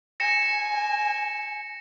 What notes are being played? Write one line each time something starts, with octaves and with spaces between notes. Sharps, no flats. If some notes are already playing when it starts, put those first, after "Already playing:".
G#5 A#6 C#7 E7